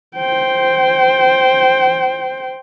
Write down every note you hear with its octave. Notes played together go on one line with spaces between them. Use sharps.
C5 G5